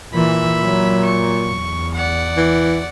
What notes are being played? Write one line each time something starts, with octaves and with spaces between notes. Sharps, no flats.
A#2 E3 E5 B5
F#3
C#6
E2
D5 F#5
E3